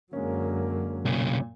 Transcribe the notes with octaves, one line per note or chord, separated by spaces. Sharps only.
F#2 D3 F#3 G#3 A#3 C#4
B1 A#2 C#3